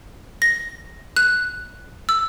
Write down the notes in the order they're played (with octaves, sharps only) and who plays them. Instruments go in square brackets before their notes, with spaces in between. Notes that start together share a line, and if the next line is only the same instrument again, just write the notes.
[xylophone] A#6
F#6
E6